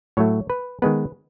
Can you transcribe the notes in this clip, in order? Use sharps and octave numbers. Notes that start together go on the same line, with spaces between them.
A2 F#3 A3 C#5
B4
D#3 G#3 B3 B4